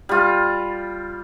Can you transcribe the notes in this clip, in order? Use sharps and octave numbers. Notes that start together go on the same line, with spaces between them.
G3 F4